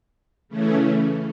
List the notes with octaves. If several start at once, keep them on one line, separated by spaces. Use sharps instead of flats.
C#3 E3 A3 C#4